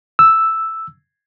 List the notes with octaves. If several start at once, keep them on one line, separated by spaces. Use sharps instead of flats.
E6